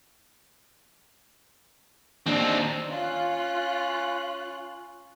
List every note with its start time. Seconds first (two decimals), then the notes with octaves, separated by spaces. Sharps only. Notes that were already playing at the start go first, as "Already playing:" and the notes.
2.26 D#2 C4 D4 D#4
2.90 C#4 F4 F#6